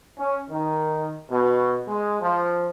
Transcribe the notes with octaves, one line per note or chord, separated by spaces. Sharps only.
C#4
D#3
B2
G#3
F3